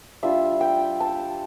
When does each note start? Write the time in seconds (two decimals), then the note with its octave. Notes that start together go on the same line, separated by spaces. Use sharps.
0.23 G3 D4 F4 E5
0.61 G5
1.00 A5